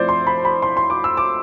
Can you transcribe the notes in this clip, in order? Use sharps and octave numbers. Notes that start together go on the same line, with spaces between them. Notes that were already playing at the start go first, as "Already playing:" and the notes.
Already playing: F3 A3 C4 E4 C5 D5
C6
B5
B5
C6
C6
D6
E6
D6